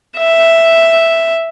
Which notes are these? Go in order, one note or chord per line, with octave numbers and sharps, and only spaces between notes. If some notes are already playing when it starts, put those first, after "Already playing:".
E5